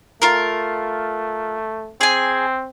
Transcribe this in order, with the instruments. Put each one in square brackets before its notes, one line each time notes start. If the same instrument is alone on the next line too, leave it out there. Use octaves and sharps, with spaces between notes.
[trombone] A3 [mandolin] F4 A#4
[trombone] C4 [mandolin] G#4 G#5